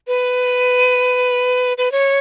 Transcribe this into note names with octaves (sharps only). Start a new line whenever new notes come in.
B4
B4
C#5